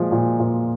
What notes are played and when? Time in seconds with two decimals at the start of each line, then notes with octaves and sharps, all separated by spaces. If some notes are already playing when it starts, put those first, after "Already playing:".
Already playing: A#2 F3 G#3
0.12 A#2
0.39 A#2